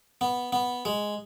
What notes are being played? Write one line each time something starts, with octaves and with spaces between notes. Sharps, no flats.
B3
B3
G#3